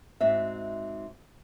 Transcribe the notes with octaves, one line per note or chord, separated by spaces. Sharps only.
G#2 C4 F#4 E5